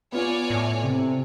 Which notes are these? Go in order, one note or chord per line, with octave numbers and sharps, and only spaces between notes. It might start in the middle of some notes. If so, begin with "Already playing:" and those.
B3 F4 C#5 D5 G#5
A2
C3